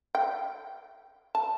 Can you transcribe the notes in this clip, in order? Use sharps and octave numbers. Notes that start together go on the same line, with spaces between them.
G5
A5